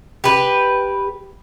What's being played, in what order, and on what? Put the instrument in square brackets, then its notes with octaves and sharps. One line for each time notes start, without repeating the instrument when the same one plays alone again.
[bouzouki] G4 B4